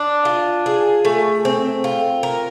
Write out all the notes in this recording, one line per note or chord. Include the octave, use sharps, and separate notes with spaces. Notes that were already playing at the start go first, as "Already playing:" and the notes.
Already playing: D4
F4
G#4
A3
C4
F4
A#4